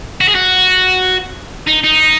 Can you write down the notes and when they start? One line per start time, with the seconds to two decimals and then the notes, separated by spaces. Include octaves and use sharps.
0.21 F#4
0.28 G#4
0.35 F#4
1.67 D#4
1.84 D#4